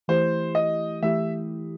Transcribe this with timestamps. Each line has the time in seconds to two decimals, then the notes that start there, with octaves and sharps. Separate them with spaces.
0.08 E3 A3 E4 G4 C5
0.55 D#5
1.02 E3 A3 E4 G4 E5